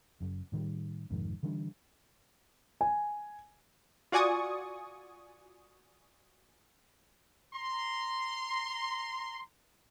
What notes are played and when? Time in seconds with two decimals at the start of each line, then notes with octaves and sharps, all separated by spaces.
0.20 F#1 F#2
0.52 A2 D#3 F3 G3
1.10 C2 F2 G#2 D#3
1.43 D3 E3 G3 D4
2.81 G#5
4.12 F4 F#4 D5 G#5 C#6 D#6
7.54 A#5 C6